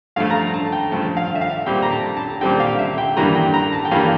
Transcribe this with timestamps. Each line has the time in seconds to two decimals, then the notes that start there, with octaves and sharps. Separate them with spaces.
0.16 G2 F3 A3 F5
0.30 A#5
0.35 A5
0.54 A5
0.72 G5
0.91 G2 F3 A3 A5
1.17 F5
1.35 E5
1.41 F5
1.66 A#2 G3 C4 G5
1.82 A#5
1.91 A5
2.17 A5
2.41 A#2 G3 C4 G5
2.60 F5
2.79 E5
2.98 G5
3.16 G2 E3 G3 A#3 A#5
3.35 G5
3.54 A#5
3.72 A5
3.85 G5
3.91 G2 E3 G3 A#3 F5